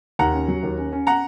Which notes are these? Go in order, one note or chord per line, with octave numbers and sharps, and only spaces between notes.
D#2 F#5 A#5
C#4
F#3
D#2
C#4
C#4
F#5 A#5